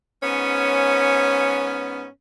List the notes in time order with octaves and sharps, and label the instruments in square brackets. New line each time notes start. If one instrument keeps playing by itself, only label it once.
[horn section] G#2 B3 C#4